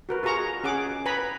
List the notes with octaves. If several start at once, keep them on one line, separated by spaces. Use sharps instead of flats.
F#4 A#4 B4
F4 F#4 G#4 A#5 C#6
C#4 G#4 F#5 D6
B4 G#5 A#5 B5